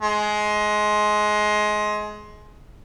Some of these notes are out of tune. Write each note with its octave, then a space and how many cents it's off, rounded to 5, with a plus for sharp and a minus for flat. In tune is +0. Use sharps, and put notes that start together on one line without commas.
G#3 +20